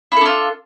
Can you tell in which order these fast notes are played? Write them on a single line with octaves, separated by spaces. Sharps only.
E4 A4 D4 F4